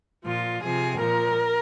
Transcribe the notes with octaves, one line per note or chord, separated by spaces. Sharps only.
A#2 F3 F4
C3 F3 G#4
A#2 F3 A#4